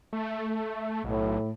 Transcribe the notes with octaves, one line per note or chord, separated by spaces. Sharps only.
A3
B1 A2